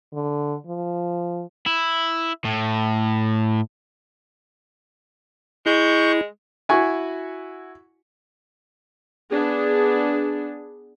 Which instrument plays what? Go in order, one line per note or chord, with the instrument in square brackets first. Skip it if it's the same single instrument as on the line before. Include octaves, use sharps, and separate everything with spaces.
[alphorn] D3
F3
[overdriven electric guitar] E4
A2
[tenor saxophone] G#3 [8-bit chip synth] E4 [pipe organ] C#6 G6
[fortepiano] E4 F#4 G#5 C#6
[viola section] B3 D4 G#4